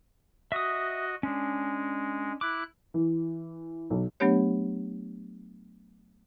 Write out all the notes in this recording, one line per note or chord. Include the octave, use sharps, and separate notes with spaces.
F#4 D#5 E5 D#6
G#3 C#4 D4
E4 D6 F#6
E3
B1
F#3 A3 B3 D4 G4 C#5